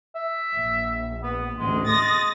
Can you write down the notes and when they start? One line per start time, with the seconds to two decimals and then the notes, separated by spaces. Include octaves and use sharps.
0.15 E5
0.55 A#1
1.23 B3
1.59 A1 D2 G#3
1.88 G#3 D#6 A6 A#6